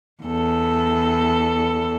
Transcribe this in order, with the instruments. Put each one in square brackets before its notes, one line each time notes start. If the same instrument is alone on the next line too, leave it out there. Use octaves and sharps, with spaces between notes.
[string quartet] E2 A4